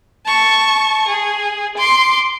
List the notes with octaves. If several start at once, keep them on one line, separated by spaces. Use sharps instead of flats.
A5 C#6
G#4
C6 D6